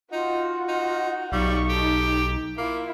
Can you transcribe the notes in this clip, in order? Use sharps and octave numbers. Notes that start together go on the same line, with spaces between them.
D#4 F4 F#4 F#5
D#4
B1 G3 D#4 F5 C#6
G4 A4
A#3 E4 F4